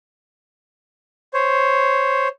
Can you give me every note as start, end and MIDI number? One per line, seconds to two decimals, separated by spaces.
1.34 2.28 72
1.34 2.28 73